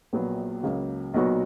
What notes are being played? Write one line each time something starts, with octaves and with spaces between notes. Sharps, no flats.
A#1 A#2 F#3 B3
C#2 C#3 F#3 A#3
B1 A#2 F#3 B3 F#4